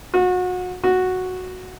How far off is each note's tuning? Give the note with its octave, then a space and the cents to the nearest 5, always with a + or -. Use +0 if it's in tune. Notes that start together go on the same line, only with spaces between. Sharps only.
F#4 -30
F#4 -5